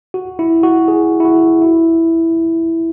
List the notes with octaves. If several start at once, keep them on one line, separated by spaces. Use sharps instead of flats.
F#4
E4
F#4
G#4
E4
F#4
E4